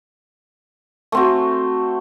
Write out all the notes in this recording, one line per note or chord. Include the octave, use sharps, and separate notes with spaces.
A3 C4 F#4